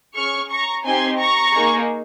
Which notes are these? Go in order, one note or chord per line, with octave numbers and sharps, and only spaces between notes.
C#4 G#4 C#6 F6
A#5 C#6
C4 D#4 G4 G#5 C6
A#5 C#6
A#3 D#4 G#4